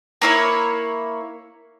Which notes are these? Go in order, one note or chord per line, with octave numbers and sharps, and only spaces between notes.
A#3 E4 C#5